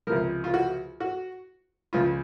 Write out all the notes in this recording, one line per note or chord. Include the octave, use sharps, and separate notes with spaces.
C#2 C3 F3 A#4
F4
F#4
F#4
C#2 C#3 F3 F4